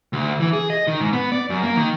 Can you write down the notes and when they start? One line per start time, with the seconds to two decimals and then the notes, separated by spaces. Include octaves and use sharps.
0.13 D2
0.40 E3
0.53 G#4
0.70 D#5
0.87 D#3
1.00 G#2
1.13 B3
1.32 D5
1.50 F#2
1.63 A#3
1.77 D#3